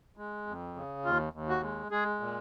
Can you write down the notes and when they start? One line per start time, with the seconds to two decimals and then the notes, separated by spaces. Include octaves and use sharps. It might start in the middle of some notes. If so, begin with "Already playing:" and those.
0.17 G#3
0.47 F2
0.75 C#3
1.05 D#2 F4
1.33 D#2
1.48 F#4
1.62 G#3
1.91 G#3 G#4
2.20 A#2